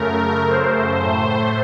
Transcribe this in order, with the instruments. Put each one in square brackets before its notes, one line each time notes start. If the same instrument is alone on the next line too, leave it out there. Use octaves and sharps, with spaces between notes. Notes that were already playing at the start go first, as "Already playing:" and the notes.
Already playing: [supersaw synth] F#2 C#3 A3 A#4
C5
A2 A3